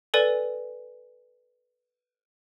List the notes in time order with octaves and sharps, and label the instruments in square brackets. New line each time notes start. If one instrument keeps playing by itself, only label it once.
[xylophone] A4 B4 D5 G#5